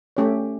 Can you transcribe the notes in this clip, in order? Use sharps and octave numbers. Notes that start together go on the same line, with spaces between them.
A3 C#4 G4 C#5